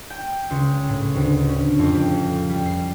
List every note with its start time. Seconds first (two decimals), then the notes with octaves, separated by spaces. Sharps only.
0.10 G5
0.51 C#2
0.88 A2
1.15 D2
1.49 C#4
1.79 F2
1.94 G4
2.50 G3
2.66 C7